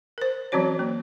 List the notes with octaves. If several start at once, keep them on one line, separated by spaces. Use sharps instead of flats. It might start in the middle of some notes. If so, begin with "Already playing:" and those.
A#4 C5
E3 F#3 C4 C#4 F#4 C#5
A#3